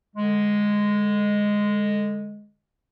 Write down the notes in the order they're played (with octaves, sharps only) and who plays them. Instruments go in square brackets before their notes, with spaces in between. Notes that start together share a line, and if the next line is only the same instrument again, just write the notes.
[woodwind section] D3 G#3